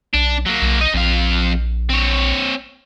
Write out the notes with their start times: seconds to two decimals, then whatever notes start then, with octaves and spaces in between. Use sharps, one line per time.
0.14 B1 D4
0.46 F#3 A#3
0.62 B1
0.81 D#4 D#5
0.94 A#1 F2 F5
1.89 C4 C#5